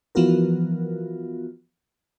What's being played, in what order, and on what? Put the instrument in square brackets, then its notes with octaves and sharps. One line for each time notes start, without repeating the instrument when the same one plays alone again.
[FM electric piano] E3 F3 B3 F4 F#4 A#4